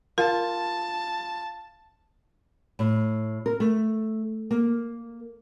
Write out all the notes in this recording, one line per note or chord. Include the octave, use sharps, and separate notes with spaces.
F4 A#4 A5
A2
A#4
A3
A#3